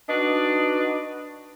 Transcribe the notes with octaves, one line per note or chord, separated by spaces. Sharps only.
D4 D#4 F#4 B4 D#5